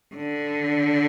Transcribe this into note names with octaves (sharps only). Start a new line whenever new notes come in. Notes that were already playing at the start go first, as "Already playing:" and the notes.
D3